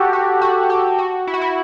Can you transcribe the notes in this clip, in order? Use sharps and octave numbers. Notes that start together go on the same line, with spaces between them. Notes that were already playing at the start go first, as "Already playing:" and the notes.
Already playing: F#4 G4 A4
F#4
F#4
G4
F#4
E4
F#4
E4